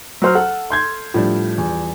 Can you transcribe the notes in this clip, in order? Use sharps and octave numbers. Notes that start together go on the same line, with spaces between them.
F#3 C5 F6
A4 F#5
C6 G6 G#6
A2 F3 G3 D4
E2